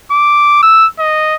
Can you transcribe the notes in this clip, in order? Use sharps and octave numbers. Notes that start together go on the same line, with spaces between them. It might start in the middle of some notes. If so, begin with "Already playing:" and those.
D6
E6
D#5